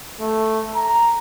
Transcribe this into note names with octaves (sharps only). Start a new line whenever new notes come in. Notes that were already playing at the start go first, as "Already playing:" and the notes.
A3
A#5